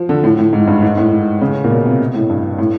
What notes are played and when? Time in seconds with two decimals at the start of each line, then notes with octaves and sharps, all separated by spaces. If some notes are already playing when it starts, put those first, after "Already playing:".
Already playing: F3
0.09 D3
0.24 A2
0.39 A2
0.53 G#2
0.67 G2
0.82 G#2
0.97 A2
1.12 G#2
1.41 C#3
1.64 A#2
1.71 B2
1.85 C3
2.15 A2
2.29 G2
2.59 A2